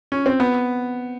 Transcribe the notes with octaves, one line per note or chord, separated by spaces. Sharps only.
C#4
C4
B3